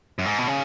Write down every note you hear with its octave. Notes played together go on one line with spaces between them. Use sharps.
F#2
G#2
B2
C#3